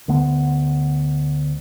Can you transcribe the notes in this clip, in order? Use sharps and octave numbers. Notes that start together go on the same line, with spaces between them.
D2 D3 A3 B3